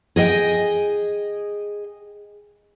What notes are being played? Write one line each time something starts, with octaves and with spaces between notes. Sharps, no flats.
G#4 D#5 G5